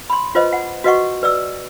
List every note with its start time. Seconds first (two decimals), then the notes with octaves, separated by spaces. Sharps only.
0.10 B5 C6
0.35 F4 B4 C5 D#5
0.53 F#5
0.84 F#4 B4 D#5 F#5 C#6
1.23 B4 D5 E6